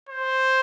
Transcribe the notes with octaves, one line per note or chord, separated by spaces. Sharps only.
C5